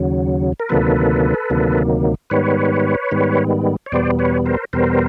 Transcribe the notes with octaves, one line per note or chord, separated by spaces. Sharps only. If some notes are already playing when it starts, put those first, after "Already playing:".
Already playing: D#2 C#3 F#3
A#4
D2 C3 D#3 F#3 A#3 A4 B4
D2 C3 D#3 F#3 A#3
G#2 D#3 G3 B3 B4 C#5
G#2 D#3 G3 B3
C#5
E2 B2 G3 B3 C5 D5
B4 C#5
A#4 C5
E2 B2 G3 B3 A#4 C5